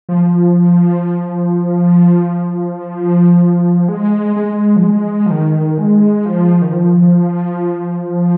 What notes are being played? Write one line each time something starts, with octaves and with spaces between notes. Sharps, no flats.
F3
G#3
G#3
F3
G#3
F3
D#3
G#3
F3
D#3
F3